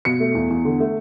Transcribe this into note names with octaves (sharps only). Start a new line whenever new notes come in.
B2 C#7
A3
E2
E2
D3
A3